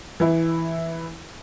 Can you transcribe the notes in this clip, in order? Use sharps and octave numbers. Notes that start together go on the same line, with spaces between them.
E3 E4